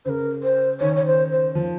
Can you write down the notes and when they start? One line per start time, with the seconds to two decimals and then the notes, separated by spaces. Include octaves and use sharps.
0.05 C#3 A#4 C5
0.43 C5
0.80 D#3 C#5
0.96 C#5
1.06 C5
1.31 C5
1.55 F3